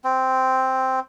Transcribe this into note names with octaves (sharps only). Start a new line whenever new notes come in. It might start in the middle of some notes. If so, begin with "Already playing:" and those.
C4